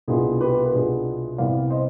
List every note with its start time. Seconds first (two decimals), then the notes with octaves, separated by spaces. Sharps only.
0.08 C2 B2 B3 D4 F4 G#4
0.41 G4 B4
0.66 B4
0.73 C2 B2 B3 D4 F4 G#4
1.38 C2 C3 G3 B3 D5 F5
1.70 C5 D#5